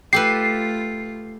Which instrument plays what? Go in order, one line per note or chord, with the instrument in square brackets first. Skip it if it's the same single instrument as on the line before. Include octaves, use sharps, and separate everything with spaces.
[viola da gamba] A3 F4 [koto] G4 A4 B4 [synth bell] C7